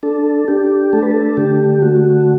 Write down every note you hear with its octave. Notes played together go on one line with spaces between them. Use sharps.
D4 A4
D4 G4
A3 A4
B4
A4
D3 G4
A3 F#4